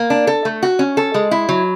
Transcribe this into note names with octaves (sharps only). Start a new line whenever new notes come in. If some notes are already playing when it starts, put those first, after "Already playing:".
Already playing: A#3
D4
A4
A3
F#4
C#4
A4
G#3
E4
F#3